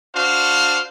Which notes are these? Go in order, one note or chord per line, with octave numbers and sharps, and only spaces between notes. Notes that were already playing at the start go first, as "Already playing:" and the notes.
D4 F#4 C5 F5